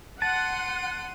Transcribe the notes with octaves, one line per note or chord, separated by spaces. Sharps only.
F#5 A5 C6 D#7